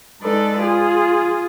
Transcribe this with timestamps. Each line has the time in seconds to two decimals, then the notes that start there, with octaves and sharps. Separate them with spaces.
0.22 G#3 D#4 A4 B4 D5
0.60 F4 G#4